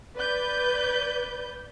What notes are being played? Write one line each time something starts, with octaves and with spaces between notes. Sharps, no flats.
B4 D5 G6